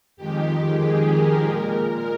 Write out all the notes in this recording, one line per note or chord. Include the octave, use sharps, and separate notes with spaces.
F2 D#3 G#3 G4
G#4
A#4
A#2 G#3